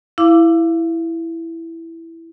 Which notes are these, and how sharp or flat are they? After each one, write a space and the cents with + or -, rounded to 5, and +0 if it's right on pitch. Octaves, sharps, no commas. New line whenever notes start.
E4 +0 F5 -20 D6 +0